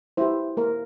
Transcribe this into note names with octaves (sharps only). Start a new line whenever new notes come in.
E4 G4 C5
A#3 A#4